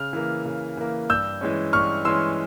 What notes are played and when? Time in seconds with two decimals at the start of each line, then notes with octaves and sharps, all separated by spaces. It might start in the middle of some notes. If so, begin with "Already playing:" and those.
Already playing: C#3 F6
0.13 E3 A#3
0.45 C#3
0.77 E3 A#3
1.10 G2 E6 G6
1.41 E3 G#3 C#4
1.73 G2 C#6 F6
2.05 E3 G#3 C#4 C6 E6